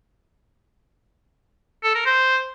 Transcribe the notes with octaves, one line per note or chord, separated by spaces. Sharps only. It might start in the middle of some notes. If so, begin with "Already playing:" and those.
A4
A#4
C5